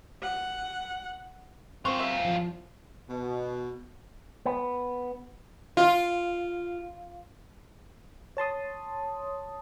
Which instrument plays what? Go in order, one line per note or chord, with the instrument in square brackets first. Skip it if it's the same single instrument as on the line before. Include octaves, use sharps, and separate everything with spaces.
[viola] F#5
[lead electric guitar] F#2 F4 [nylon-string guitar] C4 [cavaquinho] C5 C#6 D6
[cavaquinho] G4 C5 E5
[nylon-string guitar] E2 F3
[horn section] B2
[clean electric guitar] B3
[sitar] F4
[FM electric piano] C#5 A5 C6 D#6